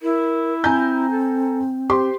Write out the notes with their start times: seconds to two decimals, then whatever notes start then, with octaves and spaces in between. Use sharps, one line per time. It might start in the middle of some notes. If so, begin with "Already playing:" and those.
0.02 E4 A#4
0.64 C4 G#5 A#5 G6
1.11 A4
1.90 G4 C5 C6